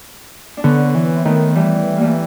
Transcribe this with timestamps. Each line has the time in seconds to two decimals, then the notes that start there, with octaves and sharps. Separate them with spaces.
0.57 D4
0.64 D3 B3 C#4
0.95 E3
1.16 C4
1.25 D#3 A3 B3
1.55 E3 G3 A3
1.97 G3 A3 A#3